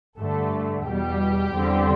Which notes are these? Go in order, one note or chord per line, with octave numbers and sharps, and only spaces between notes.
G2 D3 A3 A4
E2 B2 G3 G4
E2 D3 G3 C4